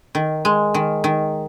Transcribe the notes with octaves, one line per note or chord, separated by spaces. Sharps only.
D#3
G#3
D#3
D#3